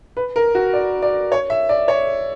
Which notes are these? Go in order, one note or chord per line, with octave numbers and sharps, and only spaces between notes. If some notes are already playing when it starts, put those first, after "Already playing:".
B4
A#4
F#4
D5
D5
C#5
E5
D5
C#5